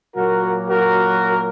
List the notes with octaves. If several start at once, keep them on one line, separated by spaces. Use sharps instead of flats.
A#2 F#3 A#3 F#4 A#4
F#4 A#4